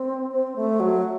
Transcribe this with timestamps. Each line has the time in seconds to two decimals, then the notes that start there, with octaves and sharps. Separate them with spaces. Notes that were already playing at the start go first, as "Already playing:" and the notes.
Already playing: C4
0.32 C4
0.56 A3
0.80 F#3